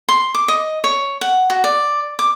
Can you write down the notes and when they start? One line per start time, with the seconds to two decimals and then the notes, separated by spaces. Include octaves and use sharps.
0.08 C6
0.34 D6
0.48 D#5
0.84 C#5
1.21 F#5
1.50 F#4
1.64 D5
2.19 D6